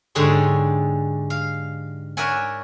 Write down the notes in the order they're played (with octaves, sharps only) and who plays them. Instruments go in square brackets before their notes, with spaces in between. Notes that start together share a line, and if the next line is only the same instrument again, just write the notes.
[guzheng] G#2 D3 G4 G#4 C#5
F5
A#4 C#5 D5 E5 F#5 G#5